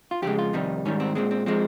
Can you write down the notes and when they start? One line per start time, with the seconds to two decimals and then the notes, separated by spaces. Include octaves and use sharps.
0.11 F4
0.22 F2 C#3 G#3 G4
0.38 F4
0.53 F2 C3 D#3 G3 D#4
0.85 G#2 D#3 G3 C#4
1.00 C4
1.15 A#2 G#3 C4
1.31 C4
1.46 F3 G#3 C4